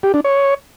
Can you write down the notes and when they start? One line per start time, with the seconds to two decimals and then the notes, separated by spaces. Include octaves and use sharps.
0.03 G4
0.14 D4
0.24 C#5